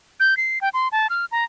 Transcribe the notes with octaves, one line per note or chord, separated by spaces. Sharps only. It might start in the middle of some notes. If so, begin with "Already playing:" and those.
G6
C7
G5
C6
A5
F6
A#5